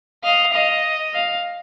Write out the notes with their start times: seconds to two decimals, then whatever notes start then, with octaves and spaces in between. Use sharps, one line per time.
0.24 D#5 F5
0.53 D#5 F5
1.14 F5